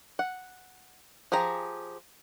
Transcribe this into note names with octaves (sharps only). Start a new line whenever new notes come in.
F#5
F3 G4 G#4 A#5